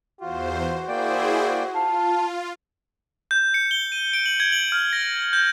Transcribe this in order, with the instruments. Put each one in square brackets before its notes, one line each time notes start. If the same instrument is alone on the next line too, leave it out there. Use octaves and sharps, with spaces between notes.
[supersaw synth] E2 C5 [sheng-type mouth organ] F4 [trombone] F#4
[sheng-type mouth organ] A#3 D5 G5 [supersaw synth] E4 G#4 C5
[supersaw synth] F4 [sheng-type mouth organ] F5 [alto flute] A5
[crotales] G6
C#7
G7
D#7
D7
F#7
G#6
F#7
F6
A#6
G6